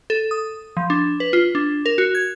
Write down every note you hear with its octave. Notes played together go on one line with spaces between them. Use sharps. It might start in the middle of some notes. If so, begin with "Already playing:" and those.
A4
D#6
F3
D4
B4
F4
D4
A#4
F#4
G#6